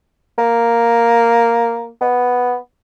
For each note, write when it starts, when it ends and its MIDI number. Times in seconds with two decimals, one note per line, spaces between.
0.38 1.88 58
2.01 2.55 59